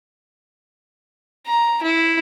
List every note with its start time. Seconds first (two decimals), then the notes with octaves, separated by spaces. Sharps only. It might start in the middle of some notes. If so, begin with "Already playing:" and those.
1.47 A#5
1.82 E4